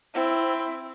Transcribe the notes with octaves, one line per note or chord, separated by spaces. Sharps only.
C4 E4